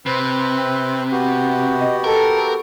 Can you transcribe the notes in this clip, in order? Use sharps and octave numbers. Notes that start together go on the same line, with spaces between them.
C3 C4 B4
B3 F#4 G4
D#5
A4 A#4